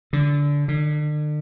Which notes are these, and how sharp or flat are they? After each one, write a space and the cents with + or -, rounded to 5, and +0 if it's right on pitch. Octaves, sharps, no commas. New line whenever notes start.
D3 -20
D3 +40